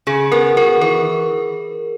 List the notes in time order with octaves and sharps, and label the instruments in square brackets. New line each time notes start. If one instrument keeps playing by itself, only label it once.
[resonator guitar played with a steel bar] C#3 [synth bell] G#4
[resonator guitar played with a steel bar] B3 [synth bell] A#4
[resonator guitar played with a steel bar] F#4 [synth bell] A#4
[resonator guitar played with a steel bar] E3 [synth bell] A#4